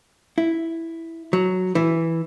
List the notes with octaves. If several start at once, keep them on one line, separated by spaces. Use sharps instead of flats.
E4
F#3
E3